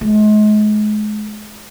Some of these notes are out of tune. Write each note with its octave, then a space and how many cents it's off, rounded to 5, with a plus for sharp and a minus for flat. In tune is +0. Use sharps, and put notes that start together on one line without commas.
G#3 +35